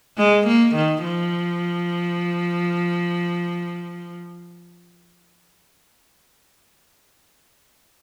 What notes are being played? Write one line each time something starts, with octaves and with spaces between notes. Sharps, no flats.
G#3
A#3
D#3
F3